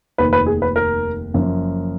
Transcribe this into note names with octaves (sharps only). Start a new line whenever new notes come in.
F1 D#2 D#3 B4
B4
G#4
B4
A#4
F#1 F#2 F3